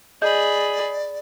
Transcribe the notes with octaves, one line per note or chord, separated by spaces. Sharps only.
G#4 D5 D#5 B5 G6